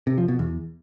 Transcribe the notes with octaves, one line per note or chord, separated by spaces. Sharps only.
C3
F3
B2
E2